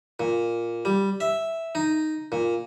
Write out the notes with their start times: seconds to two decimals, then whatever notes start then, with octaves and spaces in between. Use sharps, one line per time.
0.20 A#2
0.85 G3
1.20 E5
1.75 D#4
2.32 A#2